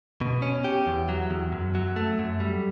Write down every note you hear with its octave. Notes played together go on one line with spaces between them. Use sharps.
B2
C#4
G4
E2
F#3
E2
F#2
F#3
A3
F#2
G3